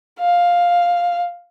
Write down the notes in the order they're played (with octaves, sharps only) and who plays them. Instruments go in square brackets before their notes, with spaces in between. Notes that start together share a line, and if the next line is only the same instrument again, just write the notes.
[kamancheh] F5